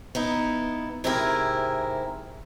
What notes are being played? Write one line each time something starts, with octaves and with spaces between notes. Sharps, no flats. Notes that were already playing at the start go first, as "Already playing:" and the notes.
B3 D#4 E4
G#2 C3 E4 G4 G#4 A#4